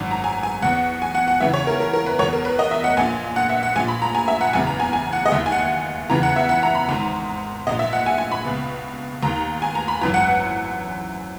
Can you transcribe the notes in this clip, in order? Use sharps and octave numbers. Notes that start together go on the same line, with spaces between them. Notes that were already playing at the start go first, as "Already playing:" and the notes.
Already playing: G#1 F#2 D#3
A#5
G#5
G#5
E2 B2 F#5
G#5
F#5
F#5
E2 C#3 E3 E5
C#5
A#4
A#4
A#4
B4
E2 B2 C#5
A#4
B4
D#5
E5
F#5
A#1 A#2 G#5
F#5
E5
F#5
A#1 A#2 G#5
B5
A#5
G#5
E5
F#5
F#1 E2 C#3 G#5
A#5
G#5
G#5
F#5
D#5
D#2 D#3 E5
G#5
F#5
E2 C#3 E3 A#5
F#5
E5
F#5
A#5
B5
G#1 G#2 D#3 A#5
A#1 A#2 D#5
E5
F#5
G#5
G#5
B5
C#2 B2
D#2 D#3 A#5
G#5
A#5
B5
G#1 F#2 E3 A#5
F#5